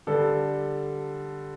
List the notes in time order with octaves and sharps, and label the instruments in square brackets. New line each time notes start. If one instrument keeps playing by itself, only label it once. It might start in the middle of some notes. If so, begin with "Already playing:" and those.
[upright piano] D3 G3 A4